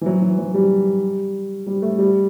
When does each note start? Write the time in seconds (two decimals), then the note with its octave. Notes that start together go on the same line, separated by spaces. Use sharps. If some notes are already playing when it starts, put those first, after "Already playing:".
0.01 E3
0.06 F#3
0.21 E3
0.38 F#3
0.54 G3
1.67 G3
1.82 A3
1.98 G3